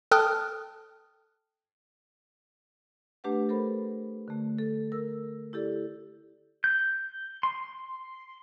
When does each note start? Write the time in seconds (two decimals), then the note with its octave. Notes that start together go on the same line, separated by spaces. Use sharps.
0.11 A4 G5 A5 D#6 F6 F#6
3.24 A3 D4 G4 B4 F#5
3.49 A4 A#4 C5 B5
4.28 D3 A3
4.59 A4
4.92 A#4 E6
5.53 E4 G4 A4 D5
6.64 G6
7.43 C6